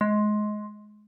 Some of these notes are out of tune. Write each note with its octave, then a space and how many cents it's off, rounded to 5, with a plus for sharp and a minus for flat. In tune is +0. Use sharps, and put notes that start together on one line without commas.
G#3 +20